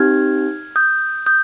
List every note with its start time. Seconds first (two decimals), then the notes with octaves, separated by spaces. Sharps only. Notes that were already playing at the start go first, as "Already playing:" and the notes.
Already playing: C4 D#4 G4 F6 G#6
0.76 D#6 G6
1.26 D#6 G6